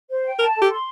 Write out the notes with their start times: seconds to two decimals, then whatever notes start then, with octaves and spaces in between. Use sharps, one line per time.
0.09 C5
0.24 G5
0.39 A#4 A5
0.55 A4
0.62 G4
0.70 C6